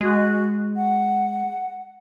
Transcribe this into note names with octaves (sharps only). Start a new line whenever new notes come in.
G#3 F#4
F#5